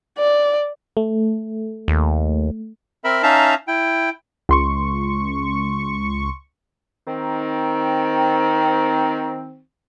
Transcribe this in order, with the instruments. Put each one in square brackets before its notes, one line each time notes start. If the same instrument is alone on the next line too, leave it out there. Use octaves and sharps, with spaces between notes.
[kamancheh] D5
[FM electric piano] A3
[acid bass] D#2
[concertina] C4 A#4 E5 B5
C#4 D#4 E5 F5 A5 A#5
E4 G5
[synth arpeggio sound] C#2 C6 C#6
[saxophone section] D#3 C4